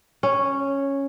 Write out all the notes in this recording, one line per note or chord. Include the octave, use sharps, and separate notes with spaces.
C#4